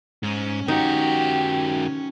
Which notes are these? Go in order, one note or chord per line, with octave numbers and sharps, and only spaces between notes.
G#2 C#4
D#3 D#4 F#4 G4